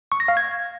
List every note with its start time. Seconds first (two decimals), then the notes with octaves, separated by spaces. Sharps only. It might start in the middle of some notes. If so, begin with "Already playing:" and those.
0.12 C#6
0.20 A#6
0.28 F5
0.37 G#6